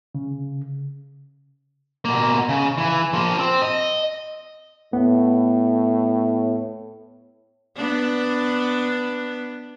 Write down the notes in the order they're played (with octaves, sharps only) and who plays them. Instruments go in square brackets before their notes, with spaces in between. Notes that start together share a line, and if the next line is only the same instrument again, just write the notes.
[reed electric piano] C#3
[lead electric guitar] B2 A#3
C#3
E3
F3 A#3
C4
D#5
[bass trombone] A2 [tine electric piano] B3
[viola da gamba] B3 D4